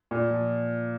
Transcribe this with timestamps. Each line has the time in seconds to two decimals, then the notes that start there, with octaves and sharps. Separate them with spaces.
0.11 A#2
0.30 F3